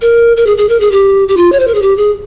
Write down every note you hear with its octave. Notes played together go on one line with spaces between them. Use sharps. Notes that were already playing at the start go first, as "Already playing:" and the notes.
A#4
A#4
G#4
G#4
A#4
G#4
G4
G4
F4
C#5
C5
A#4
G#4
G4
G#4